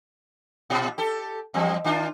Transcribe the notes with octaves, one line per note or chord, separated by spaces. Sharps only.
A#2 F4
G4 A4
E2 G3 C4
D#3 D4 F4